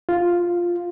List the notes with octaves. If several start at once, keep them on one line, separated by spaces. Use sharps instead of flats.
F4